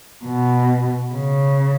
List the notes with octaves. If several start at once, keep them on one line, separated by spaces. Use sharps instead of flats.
B2
C#3